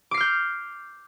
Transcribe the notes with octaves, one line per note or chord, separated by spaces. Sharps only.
D6 F6 G6 C7